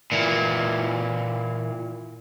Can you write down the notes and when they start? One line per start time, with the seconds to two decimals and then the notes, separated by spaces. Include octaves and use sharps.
0.12 A#2 E3